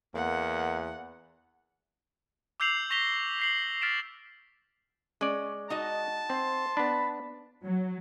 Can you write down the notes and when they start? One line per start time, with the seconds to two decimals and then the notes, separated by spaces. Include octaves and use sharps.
0.15 E2 A#3 F#5
2.60 D6 E6 G6 C7 F7 F#7
2.90 C#6 A#6 B6 F7 G7
3.40 G6 C7 F#7
3.82 F6 A6 B6 D7 E7
5.21 G#3 C#4 D5
5.70 D#4 F#4 D#5 A5
6.30 C4 C6
6.77 B3 D4 B5
7.63 F#3